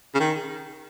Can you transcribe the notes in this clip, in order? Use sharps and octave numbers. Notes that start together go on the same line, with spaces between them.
C#3
D#3